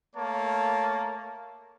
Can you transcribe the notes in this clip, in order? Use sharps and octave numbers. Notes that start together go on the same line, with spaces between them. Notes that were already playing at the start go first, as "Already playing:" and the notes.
A3 A#3 C#5 A5